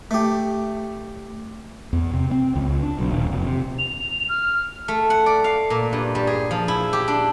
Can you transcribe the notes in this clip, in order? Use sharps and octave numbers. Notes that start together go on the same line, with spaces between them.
A3 G4
E2
C3
C4
C#2
D4
B1
D#1
F1
C3
F7
F6
A3
F#5
D5
F5
A#2
G2
G3
G#4
F3
E4
G4
D4